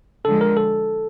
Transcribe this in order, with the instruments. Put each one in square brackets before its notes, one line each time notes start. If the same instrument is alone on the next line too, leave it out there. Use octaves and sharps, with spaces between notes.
[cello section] D3 F3 G#3 [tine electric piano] A4
[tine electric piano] A#4
A4